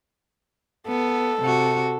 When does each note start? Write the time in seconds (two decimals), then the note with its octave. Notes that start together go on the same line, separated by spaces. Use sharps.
0.88 B3 A4
1.41 C3 F#4